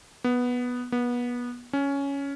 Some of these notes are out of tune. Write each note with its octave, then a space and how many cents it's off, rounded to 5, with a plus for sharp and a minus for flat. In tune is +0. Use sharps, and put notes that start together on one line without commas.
B3 -5
B3 -25
C#4 +10